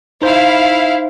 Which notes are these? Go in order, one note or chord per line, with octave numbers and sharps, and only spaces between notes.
D#4 E4 C5 F5